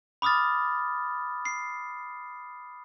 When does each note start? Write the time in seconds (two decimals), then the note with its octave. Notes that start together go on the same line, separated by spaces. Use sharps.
0.22 B5 D6 D#6 F6 A6
1.45 C7